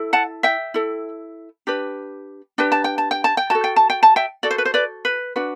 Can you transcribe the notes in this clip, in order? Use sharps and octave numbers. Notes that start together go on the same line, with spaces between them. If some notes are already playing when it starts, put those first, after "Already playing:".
Already playing: E4 A4
F#5 A5
E5 G5
E4 A4
D4 G4 B4
D4 G4 B4 G5
A5
G5
A5
G5
A5
G5
F#4 A4 A5
G5
A5
G5
A5
E5 G5
F#4 A4 D5
C5
B4
C5
B4 D5
B4
D4 F#4 B4